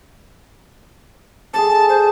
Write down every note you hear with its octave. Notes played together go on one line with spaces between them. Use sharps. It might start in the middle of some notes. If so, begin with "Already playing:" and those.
G#4 A4 D5 A5
C5